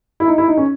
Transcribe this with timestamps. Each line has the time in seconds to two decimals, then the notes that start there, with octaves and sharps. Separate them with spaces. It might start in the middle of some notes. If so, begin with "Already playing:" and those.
0.20 E4
0.27 D#4
0.38 E4
0.48 D#4
0.57 C#4